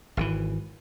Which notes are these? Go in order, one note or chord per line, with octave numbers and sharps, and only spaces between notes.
G#1 D3 E3